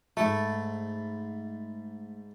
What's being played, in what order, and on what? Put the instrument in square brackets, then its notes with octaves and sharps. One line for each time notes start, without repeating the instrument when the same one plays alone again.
[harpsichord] G#2 A5 B5 [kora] A3